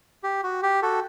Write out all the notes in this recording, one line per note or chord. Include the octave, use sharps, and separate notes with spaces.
G4
F#4
G4
F#4 A4